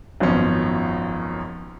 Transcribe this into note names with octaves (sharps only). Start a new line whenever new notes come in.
G#1 F#2 B2 F3 C#4